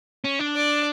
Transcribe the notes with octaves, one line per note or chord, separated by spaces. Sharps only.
C#4
D4
D5